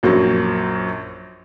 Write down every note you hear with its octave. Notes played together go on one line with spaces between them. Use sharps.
A#1 F#2 F#3